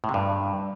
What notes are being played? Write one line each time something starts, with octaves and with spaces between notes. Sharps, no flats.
A2
C3
G2